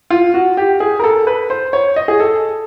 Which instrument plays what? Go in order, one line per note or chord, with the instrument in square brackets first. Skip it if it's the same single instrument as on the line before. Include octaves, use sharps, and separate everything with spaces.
[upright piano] F4
F#4
G4
G#4
A#4
A4
B4
C5
C#5
D#5
G#4
A4